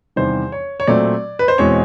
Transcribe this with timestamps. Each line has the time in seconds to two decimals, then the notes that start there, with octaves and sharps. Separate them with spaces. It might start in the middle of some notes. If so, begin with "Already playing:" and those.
0.16 E2 C3 D#3 G3 C5
0.52 C#5
0.80 C#5
0.87 A#2 F#3 A3 C4 D5
1.39 B4
1.48 C5
1.58 E2 B2 G#3 C4 C#5